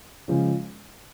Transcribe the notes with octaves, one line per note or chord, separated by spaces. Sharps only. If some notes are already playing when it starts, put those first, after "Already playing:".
C#3 F3 G#3 C#4 F4